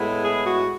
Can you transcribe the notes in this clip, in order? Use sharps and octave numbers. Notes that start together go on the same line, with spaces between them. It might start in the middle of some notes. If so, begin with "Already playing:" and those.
Already playing: A2 G#3 B3 E4
G#4
F#4